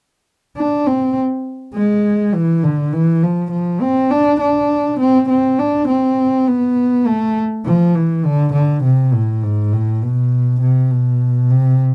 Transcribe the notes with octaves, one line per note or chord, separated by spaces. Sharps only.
D4
C4
G#3
E3
D3
E3
F3
F3
C4
D4
D4
C4
C4
D4
C4
B3
A3
F3
E3
D3
D3
C3
A2
G#2
A2
B2
C3
B2
C3